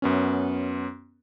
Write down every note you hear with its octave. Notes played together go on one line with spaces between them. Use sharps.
F#2 B3 C#4